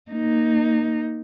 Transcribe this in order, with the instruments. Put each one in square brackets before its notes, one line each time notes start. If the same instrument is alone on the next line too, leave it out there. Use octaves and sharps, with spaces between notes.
[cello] A#3 D#4